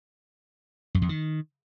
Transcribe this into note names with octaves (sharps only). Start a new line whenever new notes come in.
F#2
F2
D#3